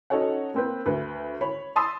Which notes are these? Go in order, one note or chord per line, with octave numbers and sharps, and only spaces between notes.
C#4 D#4 F#4 A4 C#5 F#5
A#3 C4 B4
D2 B4
C#5 B5
A5 B5 C6 D#6 E6 A6